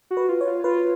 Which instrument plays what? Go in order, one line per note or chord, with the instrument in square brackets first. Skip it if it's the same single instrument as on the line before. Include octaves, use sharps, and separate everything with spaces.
[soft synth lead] F#4
[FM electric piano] B4
[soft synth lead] F4
[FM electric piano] C#5
[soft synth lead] F4
[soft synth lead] F4 [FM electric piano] B4